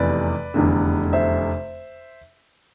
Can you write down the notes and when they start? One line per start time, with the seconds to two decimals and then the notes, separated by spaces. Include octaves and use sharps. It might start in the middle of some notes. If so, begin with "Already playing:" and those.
Already playing: F1 E2 C3 E3 B4 D5
0.54 F1 E2 D3
1.13 C5 E5